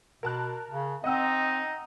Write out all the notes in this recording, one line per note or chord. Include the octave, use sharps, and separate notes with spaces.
B2 A#4 A5 F#6
C#3
C4 D#4 D#5 F#5 E6